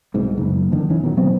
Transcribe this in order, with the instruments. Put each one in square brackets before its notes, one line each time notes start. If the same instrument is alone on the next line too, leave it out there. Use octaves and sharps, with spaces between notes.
[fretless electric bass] C2 G#2 B2
F#1
E2 D3 D#3
D#3 E3 C#4
B2 D#3 F3 F#3
F#3 B3 C4